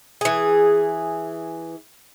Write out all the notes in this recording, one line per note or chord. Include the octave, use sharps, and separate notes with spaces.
E3 G#4